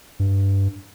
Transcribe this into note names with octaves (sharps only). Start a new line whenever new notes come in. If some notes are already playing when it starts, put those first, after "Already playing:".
G2